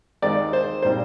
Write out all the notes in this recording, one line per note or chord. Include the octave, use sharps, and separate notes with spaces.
D#2 D#3 G#3 C4 D5
C5
A#2 G3 C4 C5